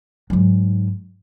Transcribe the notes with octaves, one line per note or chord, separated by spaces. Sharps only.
G#2 F#3